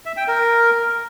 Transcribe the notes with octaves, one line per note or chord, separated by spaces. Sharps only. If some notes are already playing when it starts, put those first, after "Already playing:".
E5
G5
A#4